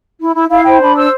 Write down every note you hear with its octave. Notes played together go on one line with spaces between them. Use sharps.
E4
E4
E4 F5
C5 G5
D4 B5
C5 E6